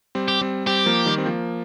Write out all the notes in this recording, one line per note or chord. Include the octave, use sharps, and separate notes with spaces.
G3 C4
G4
G3 C4
G3 C4 G4
F3 A#3
D#3 G3
C4
F3 A#3